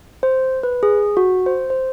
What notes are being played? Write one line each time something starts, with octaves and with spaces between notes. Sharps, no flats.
C5
B4
G#4
F#4
C5
C5